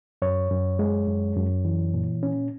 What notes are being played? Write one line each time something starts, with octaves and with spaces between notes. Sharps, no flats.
F#2 C#5
F#2
G#3
F#2
F#2
E3
A#2
C#4